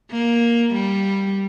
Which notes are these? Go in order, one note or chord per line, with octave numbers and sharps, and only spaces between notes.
A#3
G3